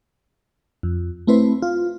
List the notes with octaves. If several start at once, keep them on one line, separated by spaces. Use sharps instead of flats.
F2
A3 C4 E4 B4 C5
F4